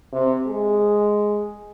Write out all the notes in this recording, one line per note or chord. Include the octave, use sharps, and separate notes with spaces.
C3
G#3